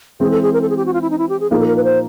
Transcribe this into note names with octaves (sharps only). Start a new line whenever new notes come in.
E3 G#3 C4 G#4
A4
G#4
A#4
A4
G#4
G4
F#4
F4
E4
D#4
E4
G4
G#4
A#2 F3 A#3 D#4 G#4
A4
A#4
B4
C5